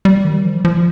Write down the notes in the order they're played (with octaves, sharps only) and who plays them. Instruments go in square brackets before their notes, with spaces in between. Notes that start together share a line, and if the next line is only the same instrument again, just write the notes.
[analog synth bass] G3
D#3
F3
F3